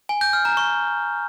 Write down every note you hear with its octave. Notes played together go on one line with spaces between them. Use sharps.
G#5
G6
F6
A#5
C#6